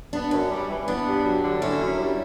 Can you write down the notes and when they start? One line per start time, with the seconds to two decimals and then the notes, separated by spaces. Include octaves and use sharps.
0.13 B3 D4
0.31 F#2 C#4
0.50 G3
0.69 E3
0.87 B3 D4
1.06 G2
1.24 F#3
1.43 D3
1.61 C#4 E4
1.80 F#2
1.99 G3